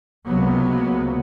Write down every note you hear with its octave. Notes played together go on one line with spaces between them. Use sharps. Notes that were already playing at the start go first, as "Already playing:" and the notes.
C#2 C3 F#3 A#3 B3